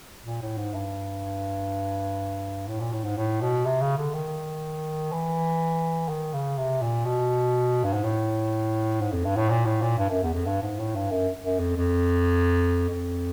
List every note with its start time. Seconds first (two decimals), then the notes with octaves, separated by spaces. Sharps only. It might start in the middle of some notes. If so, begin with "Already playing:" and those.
0.25 A#2
0.42 A2
0.57 G#2
0.74 G2
2.68 A2
2.80 A#2
2.92 A2
3.04 G#2
3.17 A2
3.41 B2
3.65 C3
3.81 C#3
3.98 D3
4.14 D#3
5.12 E3
6.08 D#3
6.33 C#3
6.58 C3
6.82 A#2
7.05 B2
7.84 G2
7.93 G#2
8.04 A2
9.01 G#2
9.12 F2
9.25 G2
9.36 A2
9.49 A#2
9.65 A2
9.82 A#2
9.98 G2
10.09 F#2
10.22 E2
10.34 F2
10.46 G2
10.63 G#2
10.79 A2
10.95 G2
11.11 F#2
11.44 F#2
11.59 F2
11.76 F2
12.89 F2